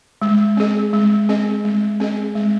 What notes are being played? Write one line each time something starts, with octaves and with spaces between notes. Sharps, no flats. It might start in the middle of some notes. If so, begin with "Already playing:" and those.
G#3
C4 G#4 D#5
G#3
C4 G#4 D#5
G#3
C4 G#4 D#5
G#3